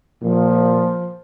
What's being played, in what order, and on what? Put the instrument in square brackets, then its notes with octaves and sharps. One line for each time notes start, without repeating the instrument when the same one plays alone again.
[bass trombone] A#2 [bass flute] F3